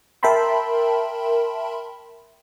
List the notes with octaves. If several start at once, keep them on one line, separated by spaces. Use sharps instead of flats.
A#4 E5 G5 A5 B5 C6